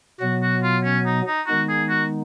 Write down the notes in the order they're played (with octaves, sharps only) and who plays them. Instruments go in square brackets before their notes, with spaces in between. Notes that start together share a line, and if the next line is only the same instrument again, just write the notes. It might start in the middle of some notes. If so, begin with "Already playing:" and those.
[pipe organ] B2 F#3 B3 [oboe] F#4
[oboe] F#4
F4
C#4
D#4
D#4
[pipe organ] D#3 G#3 B3 D#4 [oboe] F#4
[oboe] G#4
F#4